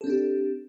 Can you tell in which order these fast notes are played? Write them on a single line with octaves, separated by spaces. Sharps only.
A4 C4 D4 G4